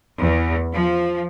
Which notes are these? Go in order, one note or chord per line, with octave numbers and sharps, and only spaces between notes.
E2
F3